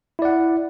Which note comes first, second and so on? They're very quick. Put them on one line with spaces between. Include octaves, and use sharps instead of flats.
E4 D5 F#5